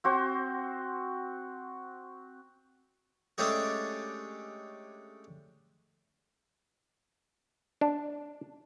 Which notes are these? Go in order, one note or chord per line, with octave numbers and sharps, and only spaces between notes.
C4 F#4 C5
G#3 A3 C#4 D4 G4 G#4
D4